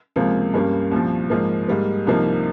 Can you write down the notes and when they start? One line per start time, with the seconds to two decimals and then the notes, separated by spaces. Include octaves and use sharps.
0.16 C#2 C3 F3 A#3
0.54 G2 G3 A#3 C#4
0.91 C2 A#2 F3
1.30 G#2 F3 A#3
1.68 G#2 G3 A#3
2.07 C2 C3 F3 A#3 D#4